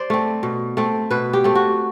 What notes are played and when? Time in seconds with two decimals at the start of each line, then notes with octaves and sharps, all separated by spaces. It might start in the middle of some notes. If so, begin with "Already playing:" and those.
Already playing: C5 D5
0.10 A3 C4
0.43 B2
0.77 A3 C4
1.11 B2 B4
1.33 G4
1.44 A3 C4
1.55 F#4